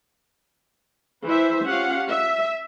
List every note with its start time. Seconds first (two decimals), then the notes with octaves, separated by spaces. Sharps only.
1.26 E3 C5 E5
1.67 C#4 F4 G4 F5 F#5
2.10 E5